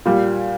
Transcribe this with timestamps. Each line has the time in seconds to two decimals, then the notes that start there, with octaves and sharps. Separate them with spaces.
0.05 A#2 G3